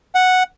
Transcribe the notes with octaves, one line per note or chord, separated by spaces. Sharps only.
F#5